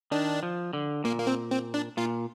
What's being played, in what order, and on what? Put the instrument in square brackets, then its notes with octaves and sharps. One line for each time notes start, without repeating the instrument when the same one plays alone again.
[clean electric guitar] D#3 [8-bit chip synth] D4
[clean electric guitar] F3
D3
[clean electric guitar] A#2 [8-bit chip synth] A#3
[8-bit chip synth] A#3
C4
C4
D4
[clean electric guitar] A#2 [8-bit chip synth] F4